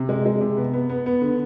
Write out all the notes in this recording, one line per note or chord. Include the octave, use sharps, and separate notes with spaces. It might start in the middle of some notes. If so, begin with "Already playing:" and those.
Already playing: C3
G#3
G#3
C3
B3
B3
B3
B3
D3